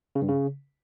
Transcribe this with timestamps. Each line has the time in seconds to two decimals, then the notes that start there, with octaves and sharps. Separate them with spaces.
0.15 C#3
0.22 G2
0.28 C#3